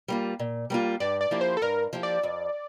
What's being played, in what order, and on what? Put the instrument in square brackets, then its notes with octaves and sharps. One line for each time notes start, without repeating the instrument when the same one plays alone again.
[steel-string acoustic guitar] G3 A#3 F4
A#2
G3 A#3 F4
[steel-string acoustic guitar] G2 [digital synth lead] D5
[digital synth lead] D5
[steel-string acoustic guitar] F3 A#3 E4 G4
[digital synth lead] C5
A4
[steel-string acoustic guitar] G2 [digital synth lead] A#4
[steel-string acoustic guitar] F3 A#3 E4 G4
[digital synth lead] D5
[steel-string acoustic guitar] F2